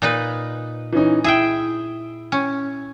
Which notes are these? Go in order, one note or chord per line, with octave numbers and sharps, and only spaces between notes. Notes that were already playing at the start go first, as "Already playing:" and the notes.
A#2 D#4 B4
E3 C#4 D#4
E4 G#4 E5 G5
C#4